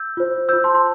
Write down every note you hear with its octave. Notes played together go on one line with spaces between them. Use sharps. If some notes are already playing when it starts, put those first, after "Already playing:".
Already playing: E6 G6
F4 C5
F4 C5 E6 G6
A5 C6
C6